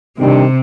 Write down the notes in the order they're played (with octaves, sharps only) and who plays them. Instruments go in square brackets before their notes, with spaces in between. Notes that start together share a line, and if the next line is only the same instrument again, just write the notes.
[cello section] C3 [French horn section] D#3 G3 D4 G4